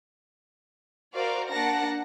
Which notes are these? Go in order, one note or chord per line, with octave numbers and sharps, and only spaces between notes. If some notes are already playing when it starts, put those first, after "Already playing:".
F#4 A#4 C5 D5 F5
A#3 D4 F#5 A5 A#6